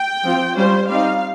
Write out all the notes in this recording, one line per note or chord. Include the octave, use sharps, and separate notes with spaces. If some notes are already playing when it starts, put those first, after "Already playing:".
Already playing: G5
F3 C4 F4
G3 C#4 F4 C5
G3 C4 D#4 F5